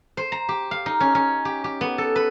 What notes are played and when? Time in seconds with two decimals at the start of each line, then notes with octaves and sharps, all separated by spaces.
0.17 C5
0.32 A#5
0.49 G4
0.71 F5
0.86 D#4
1.00 C#4
1.15 C#4
1.45 G4
1.64 G4
1.81 B3
1.98 A4
2.16 B4